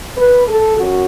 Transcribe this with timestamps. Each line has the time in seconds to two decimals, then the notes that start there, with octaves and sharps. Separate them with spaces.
0.18 B4
0.48 A4
0.77 F#2 F#4